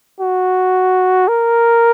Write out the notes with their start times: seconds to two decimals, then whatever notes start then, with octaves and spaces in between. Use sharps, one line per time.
0.20 F#4
1.28 A#4